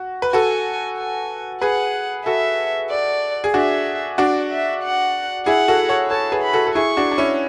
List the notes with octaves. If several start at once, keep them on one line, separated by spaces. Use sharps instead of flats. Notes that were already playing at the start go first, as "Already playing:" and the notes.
Already playing: F#4
B4
F#4 A4 G#5
G#5
G#4 B4 F#5
F#4 A4 E5
D5
G#4
D4 F#4 E5
D4 F#4 D5
E5
F#5
E4 G#4 F#5
F#4 A4
A4 C#5
A4 C#5 A5
G#4 B4
B5
F#4 A4
A4
E4 G#4 C#6
D4 F#4
D4
C#4 E4